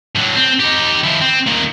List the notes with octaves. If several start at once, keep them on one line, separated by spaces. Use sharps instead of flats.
A2 F#3
C4
D#4 G4
F3 E4
C4
A#2 D#3